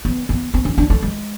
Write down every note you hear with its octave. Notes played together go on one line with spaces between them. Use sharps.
B3
B3
C4
C#4
D4
A3
G#3